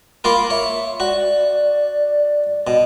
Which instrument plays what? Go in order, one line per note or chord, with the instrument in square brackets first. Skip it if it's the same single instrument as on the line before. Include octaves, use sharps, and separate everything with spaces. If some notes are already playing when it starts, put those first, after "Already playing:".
[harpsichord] A#3 F4 A#4 [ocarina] B5
[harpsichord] C#5 [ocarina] E5
[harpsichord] F#4 [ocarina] D5
[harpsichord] B2